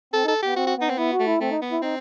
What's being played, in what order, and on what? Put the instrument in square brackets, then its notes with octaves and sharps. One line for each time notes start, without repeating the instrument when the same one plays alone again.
[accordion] C4 [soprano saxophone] A4
[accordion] D#4 [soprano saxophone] A4
[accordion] B3 [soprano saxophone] G4
[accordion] C4 [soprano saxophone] F#4
[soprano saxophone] F#4
[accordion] B3 [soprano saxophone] D#4
[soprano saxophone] C4
[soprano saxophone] B3 [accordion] E4
[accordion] F#4
[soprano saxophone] A3
[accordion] E4
[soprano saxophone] A3 [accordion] C4
[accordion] D#4
[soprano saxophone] B3
[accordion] E4
[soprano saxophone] C4 [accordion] D#4